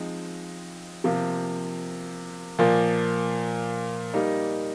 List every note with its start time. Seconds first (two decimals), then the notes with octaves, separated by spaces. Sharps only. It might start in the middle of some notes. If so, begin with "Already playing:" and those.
Already playing: F3 G#3 C4 D#4
1.04 C3 F3 A#3
2.59 A#2 F3 A#3
4.14 G3 A#3 D#4